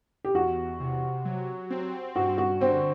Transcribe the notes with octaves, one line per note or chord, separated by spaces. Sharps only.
G4
E2 F#4
C3
F#3
C4
G2 F#4
F#4
D3 C4